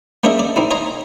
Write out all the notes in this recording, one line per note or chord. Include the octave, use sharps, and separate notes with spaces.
A#3 C#4 D4 G#4 D#5 E5
D5
C4 D#4 E4
C#5 D#5 G#5 A#5 C6